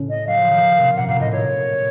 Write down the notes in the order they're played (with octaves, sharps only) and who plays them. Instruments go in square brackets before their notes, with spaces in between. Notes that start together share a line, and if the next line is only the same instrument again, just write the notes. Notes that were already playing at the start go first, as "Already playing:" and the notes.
Already playing: [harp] A2 C#3
[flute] D#5
[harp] F#3 [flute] F5
[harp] F3
D#3
C3
[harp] A#2 [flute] F#5
[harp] A#2 [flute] F5
[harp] A2 [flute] D#5
[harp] A#2 [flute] C#5